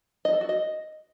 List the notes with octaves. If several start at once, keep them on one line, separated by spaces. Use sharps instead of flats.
D#5
A4
F#4
D#5